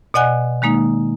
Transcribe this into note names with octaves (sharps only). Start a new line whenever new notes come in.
B2 D5 D#5 F#5 G#5 F#6
D#3 G#3 A#3 D#4